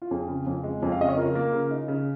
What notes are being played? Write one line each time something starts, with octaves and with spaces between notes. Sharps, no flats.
F4
F2 G#4
C#3
F2
G#3
F2
F5
C#3 D#5
C#5
C#3 F4 A#4
A#3
C#3
D#4
C#3